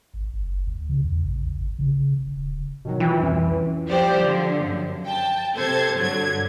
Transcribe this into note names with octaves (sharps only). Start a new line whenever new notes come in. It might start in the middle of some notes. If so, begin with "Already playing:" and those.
G#1
F#1
D2
C#3
E2
A1
A#1
G#1
C#3
D#1
B2 D#3 F#3
E3 E4 F4 G5
C2 F2 C#4
F3 G3 G4 C5 D5
D3 F3
F#2
G5 A5
C3 A4 C5 A5 G#6
G2 D3 F#3 G#6